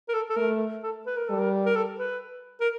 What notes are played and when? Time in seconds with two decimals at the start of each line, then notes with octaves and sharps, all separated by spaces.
0.08 A#4
0.14 A4
0.30 A4
0.36 A3 A#4
0.83 A4
1.06 B4
1.17 A#4
1.28 G3 A4
1.39 A#4
1.66 A#4
1.76 A4
1.99 B4
2.60 A#4